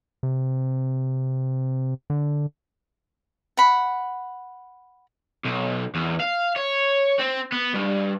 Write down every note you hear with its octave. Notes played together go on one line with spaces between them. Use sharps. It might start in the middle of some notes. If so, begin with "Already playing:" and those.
C3
D3
F#5 B5
B1
E2
F5
C#5
C4
B3
G2